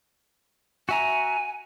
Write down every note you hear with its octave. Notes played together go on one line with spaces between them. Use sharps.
F#4 E5 G#5 A#5